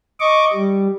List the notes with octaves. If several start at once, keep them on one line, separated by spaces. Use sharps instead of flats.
D#5 C#6 D6
G3